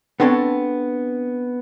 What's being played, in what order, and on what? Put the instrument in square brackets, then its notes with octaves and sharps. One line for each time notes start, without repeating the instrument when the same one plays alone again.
[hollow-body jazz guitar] B3 C4 D4 A4 C#5